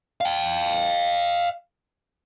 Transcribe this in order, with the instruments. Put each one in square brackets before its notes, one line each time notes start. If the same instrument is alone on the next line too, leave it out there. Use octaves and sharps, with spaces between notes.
[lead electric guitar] F5 G5